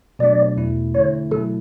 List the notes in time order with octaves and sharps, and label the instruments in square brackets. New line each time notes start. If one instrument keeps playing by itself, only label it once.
[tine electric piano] B2 F#3 A3 D4 [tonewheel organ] D5
[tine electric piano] E2 B2 A3 E4
[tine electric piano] D3 A3 C#4 E4 [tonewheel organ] C#5
[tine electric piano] B2 F#3 A3 E4 [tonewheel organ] A4